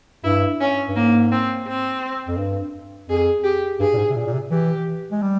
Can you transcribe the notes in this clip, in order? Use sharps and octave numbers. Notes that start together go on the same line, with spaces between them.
G2 E4
C#4
G2
G#2 A#3
C4
C4
F2
G2
F2 G#4
G4
G2 G#4
A#2
G#2
C3
A#2
A#2
C3
E3 G4
G#3
G3